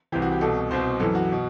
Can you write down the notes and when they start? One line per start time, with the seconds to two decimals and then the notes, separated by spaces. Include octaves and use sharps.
0.12 C2 C3 E3 G4
0.22 F#4
0.32 G4
0.41 C2 B2 A4
0.71 C2 B2 C5
1.00 F#2 E3 A4
1.15 F#4
1.32 B2